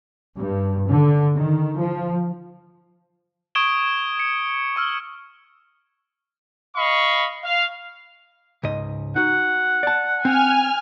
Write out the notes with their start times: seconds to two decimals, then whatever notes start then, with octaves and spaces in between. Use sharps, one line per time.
0.39 G2
0.89 D3
1.35 D#3
1.77 F3
3.55 C#6 D#6 G#6 D7 E7 G7
4.20 C#7
4.76 C#6 E6 F6
6.75 D#5 F5 B5 C#6
7.43 F5
8.63 C#2 G#2 D#5
9.16 D#4 F#4 F#5
9.83 D5 A5
10.25 C4 G#5 F6